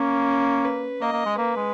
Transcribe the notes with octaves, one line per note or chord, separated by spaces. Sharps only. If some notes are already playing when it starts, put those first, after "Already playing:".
Already playing: A#3 C#4
B4
A#3 D#5
A#3
G#3
A#3 B4
G#3